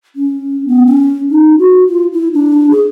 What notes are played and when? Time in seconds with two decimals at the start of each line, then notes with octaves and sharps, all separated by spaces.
0.16 C#4
0.68 B3
0.87 C#4
1.30 D#4
1.58 F#4
1.87 F4
2.13 E4
2.34 D4
2.70 G#4